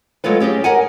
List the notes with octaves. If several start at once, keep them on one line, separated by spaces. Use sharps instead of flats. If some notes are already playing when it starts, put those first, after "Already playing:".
F#3 G#3 A3 F4 B4
C#4 G4 G#4 D#5
A#4 D#5 F#5 G#5